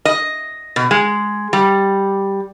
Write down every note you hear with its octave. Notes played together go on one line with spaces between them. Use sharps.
D#5
B2
G#3
G3